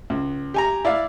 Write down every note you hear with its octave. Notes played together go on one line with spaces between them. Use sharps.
C#2
G4 G#5 A#5
E4 D5 F5